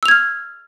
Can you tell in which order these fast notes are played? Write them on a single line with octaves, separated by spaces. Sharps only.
E6 F7 G#6 F6